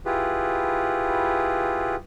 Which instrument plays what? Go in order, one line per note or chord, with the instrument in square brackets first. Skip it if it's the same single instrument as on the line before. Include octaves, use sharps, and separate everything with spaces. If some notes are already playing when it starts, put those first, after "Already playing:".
[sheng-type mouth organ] E4 F4 G4 G#4 B4